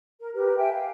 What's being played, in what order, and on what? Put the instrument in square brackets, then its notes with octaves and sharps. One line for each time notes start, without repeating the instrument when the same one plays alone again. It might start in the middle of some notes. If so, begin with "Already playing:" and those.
[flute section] A#4
G4 A#4 B4
E5 G5 G#5
F5